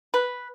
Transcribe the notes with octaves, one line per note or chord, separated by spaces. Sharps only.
B4